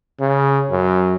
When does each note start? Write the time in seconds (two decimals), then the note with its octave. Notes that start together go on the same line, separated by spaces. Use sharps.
0.20 C#3
0.71 F#2